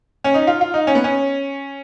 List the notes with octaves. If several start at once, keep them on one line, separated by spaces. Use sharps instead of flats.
C#4
D#4
F4
F4
D#4
C#4
B3
C#4